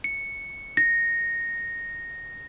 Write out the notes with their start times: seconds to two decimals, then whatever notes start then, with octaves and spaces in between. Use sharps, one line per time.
0.04 C#7
0.77 A#6